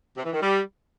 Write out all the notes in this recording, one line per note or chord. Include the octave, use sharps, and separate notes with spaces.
C3
E3
D#3
G3